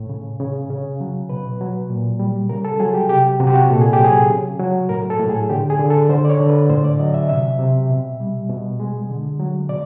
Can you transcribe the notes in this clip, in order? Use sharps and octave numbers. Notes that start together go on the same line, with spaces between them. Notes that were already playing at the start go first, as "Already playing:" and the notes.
Already playing: A2
C#3
C#3
C#3
F#3
B2 B4
F#3
A#2
G3
C#3 A#4
A4
F#3 G#4
G4
C3 G4
C3 F#4
G4
F#4
A#2 A4
G#4
G4
F#3 G#4
C#3
F#3
A2 A#4
A4
A2
G#4
D3 G4
G#4
D3
A4
D3 C5
D5
C#5
D3
B4
A2 C5
D5
F#3 D#5
E5
C3 E5
C3
B2
G3
B2
G#3
D3
F#3
B2 D5